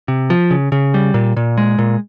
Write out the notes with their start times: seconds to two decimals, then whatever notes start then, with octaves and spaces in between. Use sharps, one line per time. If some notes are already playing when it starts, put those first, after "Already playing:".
0.08 C3
0.30 F3
0.51 C#3
0.72 C#3
0.94 G3
1.14 A#2
1.37 A#2
1.58 G#3
1.78 A#2